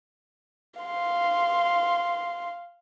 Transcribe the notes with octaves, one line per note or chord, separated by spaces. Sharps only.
F5 C6